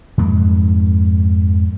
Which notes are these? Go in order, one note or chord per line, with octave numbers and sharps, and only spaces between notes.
F2 G#2 A#3